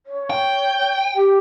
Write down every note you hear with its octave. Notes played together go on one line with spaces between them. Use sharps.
C#5
G5
G4